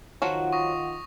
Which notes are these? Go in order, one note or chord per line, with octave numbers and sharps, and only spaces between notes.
D#3 F3 F#3 F4 F#4 F#5
C#6 D#6 A#6